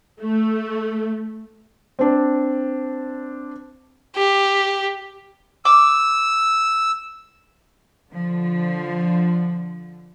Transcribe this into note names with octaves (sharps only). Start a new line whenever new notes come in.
A3
C4 D4
G4
D6 E6
D3 F3